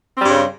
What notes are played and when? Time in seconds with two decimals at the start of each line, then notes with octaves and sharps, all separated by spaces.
0.17 C4
0.22 G3
0.26 G2
0.30 C#3